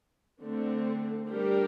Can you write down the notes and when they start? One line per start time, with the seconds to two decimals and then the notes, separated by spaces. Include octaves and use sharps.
0.42 D3 A3 C4
1.29 G3 D4 G4 A#4